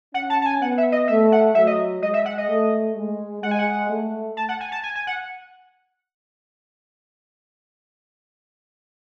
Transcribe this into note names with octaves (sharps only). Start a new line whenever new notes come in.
C#4 F#5
A5
A5
G#5
B3 F#5
E5
D#5
A3 E5
F#5
F#3 E5
D#5
G#3 D#5
E5
F#5
D#5
A3
G#3
G#3 F#5
G#5
F#5
A3
A5
F#5
G#5
A5
G#5
G#5
F#5